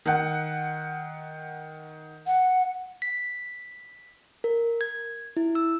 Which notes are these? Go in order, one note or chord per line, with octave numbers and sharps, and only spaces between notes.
D#3 F#5
F#5
B6
A#4
G#6
E4
E6